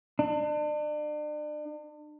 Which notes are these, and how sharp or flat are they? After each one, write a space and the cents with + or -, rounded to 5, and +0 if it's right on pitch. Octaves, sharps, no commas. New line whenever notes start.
D4 +40